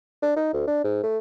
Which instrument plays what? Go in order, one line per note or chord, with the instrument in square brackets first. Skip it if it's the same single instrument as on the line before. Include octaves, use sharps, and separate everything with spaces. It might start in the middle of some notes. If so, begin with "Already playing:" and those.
[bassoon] D4
D#4
D2
D4
G#2
A3